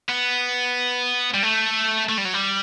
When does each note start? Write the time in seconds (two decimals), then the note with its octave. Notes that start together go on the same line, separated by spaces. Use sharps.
0.09 B3
1.34 G3
1.43 A3
2.09 A3
2.18 G3
2.25 F#3
2.34 G3